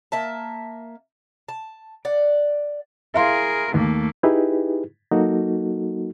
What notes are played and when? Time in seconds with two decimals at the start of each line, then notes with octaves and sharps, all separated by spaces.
0.12 A#3 E5 A5
1.49 A5
2.05 D5 F#5
3.14 E4 G#4 A#4 F5 C6
3.74 D#2 A3 A#3
4.23 D#4 E4 G4 G#4 B4
5.11 F#3 A#3 D#4 F#4 A4